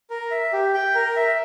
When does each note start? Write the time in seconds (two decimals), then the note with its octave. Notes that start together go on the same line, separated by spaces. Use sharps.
0.10 A#4
0.31 E5
0.53 G4
0.74 G5
0.95 A#4
1.16 E5